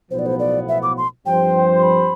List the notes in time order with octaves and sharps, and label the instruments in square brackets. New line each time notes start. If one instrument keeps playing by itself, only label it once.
[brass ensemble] B1 A2 F3 B3 [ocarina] C5
[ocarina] D5
C5
D5
E5
D6
C6
[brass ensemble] G2 F3 C4 G4 C5 [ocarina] G5
[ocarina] C6
B5